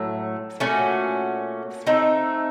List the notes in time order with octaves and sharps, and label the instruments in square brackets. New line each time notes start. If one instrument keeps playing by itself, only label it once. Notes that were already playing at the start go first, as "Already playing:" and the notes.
Already playing: [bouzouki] A2 F#3 A3
A#2 A3 C#4 F#4
A3 C4 D#4